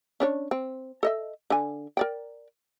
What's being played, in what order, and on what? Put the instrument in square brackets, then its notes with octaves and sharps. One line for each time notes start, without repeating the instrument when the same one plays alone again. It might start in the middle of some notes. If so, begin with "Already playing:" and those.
[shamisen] C#4 D4 C#5
C4
A4 D#5 E5
D3 G#5
A#4 D5 G5